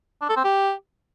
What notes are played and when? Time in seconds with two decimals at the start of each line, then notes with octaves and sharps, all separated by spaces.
0.21 D4
0.29 A4
0.36 C4
0.44 G4